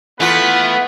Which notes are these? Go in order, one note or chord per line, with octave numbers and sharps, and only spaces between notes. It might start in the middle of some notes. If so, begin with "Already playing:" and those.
E3 A3 B3 F4 B4